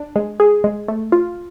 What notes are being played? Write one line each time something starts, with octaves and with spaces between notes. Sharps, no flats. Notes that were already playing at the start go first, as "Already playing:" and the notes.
Already playing: D4
G#3
G#4
G#3
A3
F4